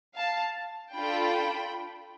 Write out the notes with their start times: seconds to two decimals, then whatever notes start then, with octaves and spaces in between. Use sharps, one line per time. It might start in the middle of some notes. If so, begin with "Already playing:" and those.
0.15 F5 A5
0.95 D4 F4 A4 G5 B5